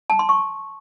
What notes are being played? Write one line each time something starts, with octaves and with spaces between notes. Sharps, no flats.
A5
C6
C#6